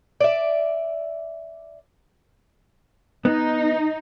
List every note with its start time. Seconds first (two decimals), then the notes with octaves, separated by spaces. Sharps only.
0.20 D5 E5
3.25 B3 D#4